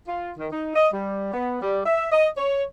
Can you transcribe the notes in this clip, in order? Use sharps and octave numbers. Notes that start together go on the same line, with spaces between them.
F4
D#3
D#4
D#5
G3
B3
G3
E5
D#5
C#5